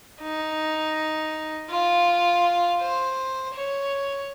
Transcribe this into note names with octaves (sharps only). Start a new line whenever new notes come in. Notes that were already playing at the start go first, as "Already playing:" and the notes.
D#4
F4
C5
C#5